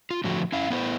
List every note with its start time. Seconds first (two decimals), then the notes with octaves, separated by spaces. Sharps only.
0.11 F4
0.24 A2 D3 F3 F#4
0.52 C#4 E4 F5
0.70 B3 E4 A#4 C5